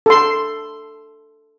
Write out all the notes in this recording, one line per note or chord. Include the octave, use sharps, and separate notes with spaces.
A4 C6